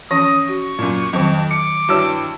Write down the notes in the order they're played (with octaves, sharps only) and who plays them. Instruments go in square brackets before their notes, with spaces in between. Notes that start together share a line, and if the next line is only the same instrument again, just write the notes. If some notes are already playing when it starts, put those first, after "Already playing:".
[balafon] E3 F3 C#4 [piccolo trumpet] D#6 [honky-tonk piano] A#6
[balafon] F#4 [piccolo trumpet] C#6
[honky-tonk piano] F#2 A#2
[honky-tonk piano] F2 [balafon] D#3 F#3
[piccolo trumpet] D6 [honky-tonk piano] C#7
[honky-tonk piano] G2 E3 E6 [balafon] F#4 C#5 D5